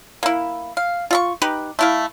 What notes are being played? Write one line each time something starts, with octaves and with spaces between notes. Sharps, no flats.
A#3 E4
F5
F4 E5 C#6
D#4 G4 B4
A3 E4 F5